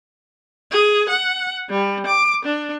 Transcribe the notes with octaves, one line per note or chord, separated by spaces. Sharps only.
G#4
F#5
G3
D6
D4